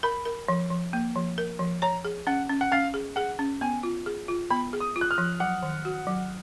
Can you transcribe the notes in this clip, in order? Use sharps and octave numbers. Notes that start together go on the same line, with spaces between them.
A#4 B5
A#4
F3
F3
A#3
F3
A#4
F3
C#5 A#5
G#4
C#4 F#5
C#4
F#5
C#4 F5
G#4
G#4 F#5
C#4
B3 G#5
F4
G#4
F4
B3 B5
G#4
D#6
F4
F#6
F6
F3
F#3 F#5
D#3
F#4
F#3